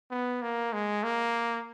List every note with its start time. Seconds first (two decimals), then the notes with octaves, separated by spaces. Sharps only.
0.11 B3
0.42 A#3
0.73 G#3
1.04 A#3